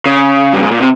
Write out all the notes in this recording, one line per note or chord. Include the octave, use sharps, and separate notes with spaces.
C#3
G2
G#2
A#2
C3